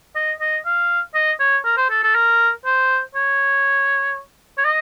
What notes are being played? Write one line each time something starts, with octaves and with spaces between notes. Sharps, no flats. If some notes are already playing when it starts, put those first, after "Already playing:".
D#5
D#5
F5
D#5
C#5
A#4
C5
A4
A4
A#4
C5
C#5
C#5
D#5